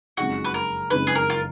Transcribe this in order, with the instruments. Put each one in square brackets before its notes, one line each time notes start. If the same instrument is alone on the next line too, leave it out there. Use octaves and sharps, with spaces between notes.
[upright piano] F#1 F2 C#3 G#3 D#4 [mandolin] F#4
[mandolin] B4
A#4
[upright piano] F#1 F2 C#3 G#3 D#4 [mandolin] B4
[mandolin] G#4
A#4
F4